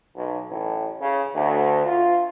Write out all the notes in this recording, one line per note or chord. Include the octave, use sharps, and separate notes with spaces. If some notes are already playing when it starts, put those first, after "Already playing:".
B1
A1
C#3
D2
F4